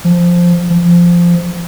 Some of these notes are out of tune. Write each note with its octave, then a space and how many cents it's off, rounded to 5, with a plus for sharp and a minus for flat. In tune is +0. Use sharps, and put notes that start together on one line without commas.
F3 +0
F3 -10